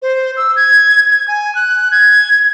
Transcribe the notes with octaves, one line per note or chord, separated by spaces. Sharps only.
C5
E6
G#6
G#6
G#5
F#6
G#6